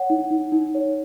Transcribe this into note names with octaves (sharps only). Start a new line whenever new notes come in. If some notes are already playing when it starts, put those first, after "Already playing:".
Already playing: C#5 F#5
D#4
D#4
D#4
C#5